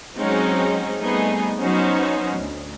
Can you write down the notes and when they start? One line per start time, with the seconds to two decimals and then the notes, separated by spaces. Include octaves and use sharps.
0.18 F#3 G#3 C4 C#4 D#4 F#4
0.99 G3 A3 B3 C4 D#4 G#4
1.60 F#3 B3 C#4 D#4 F#4 C5
2.36 D2